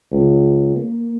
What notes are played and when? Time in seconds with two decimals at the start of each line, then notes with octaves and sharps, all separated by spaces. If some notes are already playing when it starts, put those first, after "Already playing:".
0.12 C#2
0.76 A#3